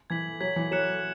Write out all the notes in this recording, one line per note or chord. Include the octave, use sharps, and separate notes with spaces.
E3 G#6 B6 F#7
F#3 G#6 B6 F#7
E3
F#3 F#6 C#7 E7